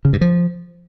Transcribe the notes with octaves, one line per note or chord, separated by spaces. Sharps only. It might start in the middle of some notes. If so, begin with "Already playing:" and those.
C#3
G2
F3